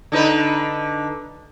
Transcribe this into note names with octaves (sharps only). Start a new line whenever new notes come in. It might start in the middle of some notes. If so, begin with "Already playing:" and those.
D3 D#4 B4